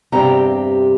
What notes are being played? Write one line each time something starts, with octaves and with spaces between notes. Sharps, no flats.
E2 G2 C3 C4 G4 A#5